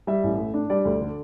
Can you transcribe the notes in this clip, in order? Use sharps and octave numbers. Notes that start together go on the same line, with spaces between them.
G3 E5
A1
A2
D4
G3 D5
D2
D3